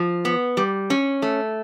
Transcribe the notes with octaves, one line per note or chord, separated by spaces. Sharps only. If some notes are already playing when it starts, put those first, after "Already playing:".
Already playing: F3
B3
G3
C#4
A3